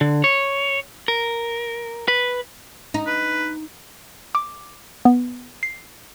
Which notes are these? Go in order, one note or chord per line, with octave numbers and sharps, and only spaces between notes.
D3
C#5
A#4
B4
D#4
B4
D6
B3
C7